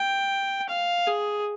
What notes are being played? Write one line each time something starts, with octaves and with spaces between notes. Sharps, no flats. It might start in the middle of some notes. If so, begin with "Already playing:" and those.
Already playing: G5
F5
G#4